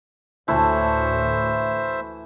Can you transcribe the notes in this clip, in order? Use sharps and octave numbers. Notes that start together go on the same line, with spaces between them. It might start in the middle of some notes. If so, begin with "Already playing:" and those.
D2 A2 E3 A3 E4 C5 E5